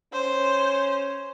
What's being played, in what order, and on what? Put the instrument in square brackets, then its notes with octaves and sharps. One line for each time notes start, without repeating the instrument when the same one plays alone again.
[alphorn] C#4 [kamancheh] C5